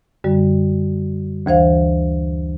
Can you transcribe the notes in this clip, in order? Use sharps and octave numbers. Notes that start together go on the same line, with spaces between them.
F#2 D3 G3
D2 E3 C5 F5